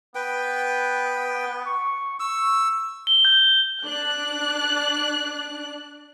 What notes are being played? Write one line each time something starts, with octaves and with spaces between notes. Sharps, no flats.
B3 B4 G5
C#6
C#6 E6
G7
G6
D4 D5 F#6